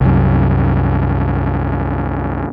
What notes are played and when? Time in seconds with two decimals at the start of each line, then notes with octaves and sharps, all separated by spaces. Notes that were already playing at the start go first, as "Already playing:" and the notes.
0.01 C2 F#2